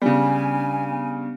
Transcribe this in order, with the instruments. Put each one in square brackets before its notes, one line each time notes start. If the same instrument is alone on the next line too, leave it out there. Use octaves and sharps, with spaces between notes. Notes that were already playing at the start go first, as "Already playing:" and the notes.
[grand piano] C#3 G3 [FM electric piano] B3 D4 [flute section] G#5